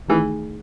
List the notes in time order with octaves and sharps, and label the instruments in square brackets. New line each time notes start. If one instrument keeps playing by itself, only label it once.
[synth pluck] D#3 A3 D#4 G#4 [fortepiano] E3